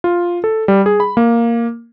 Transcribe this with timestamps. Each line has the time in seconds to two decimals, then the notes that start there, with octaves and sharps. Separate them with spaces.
0.04 F4
0.44 A4
0.68 G3
0.86 G#4
1.00 B5
1.17 A#3